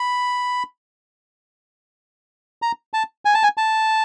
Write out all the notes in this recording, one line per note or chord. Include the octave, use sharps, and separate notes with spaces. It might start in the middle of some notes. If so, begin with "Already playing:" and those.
Already playing: B5
A#5
A5
G#5
A5
G#5
A5